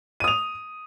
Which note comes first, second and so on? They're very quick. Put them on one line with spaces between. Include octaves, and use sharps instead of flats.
D#7 D#6 F7